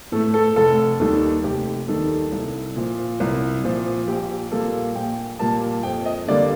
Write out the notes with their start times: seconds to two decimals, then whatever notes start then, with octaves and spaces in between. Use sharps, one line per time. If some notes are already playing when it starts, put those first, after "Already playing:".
0.12 A2 A4
0.15 A3
0.34 A4
0.56 F1 A4
1.00 D#2 D#3 G3 A4
1.44 F1 G4
1.88 D#2 D#3 G3 A4
2.32 C2
2.76 A#2 F3
3.20 C2
3.64 A#2 F3
4.07 A#1 G4
4.51 A#2 G3 A#3 A4
4.96 A#1 G5
5.39 A#2 G3 A#3 A5
5.83 F2 G5
6.06 D#5
6.28 D3 G3 A#3 D5